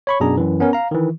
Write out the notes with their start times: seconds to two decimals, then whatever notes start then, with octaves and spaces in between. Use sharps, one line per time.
0.07 C#5 B5 C#6
0.20 F#2 B2 D4 G#4 A#5
0.37 F#2 E3
0.60 B3 C#4 A#4
0.73 F5 A#5
0.91 D#3 E3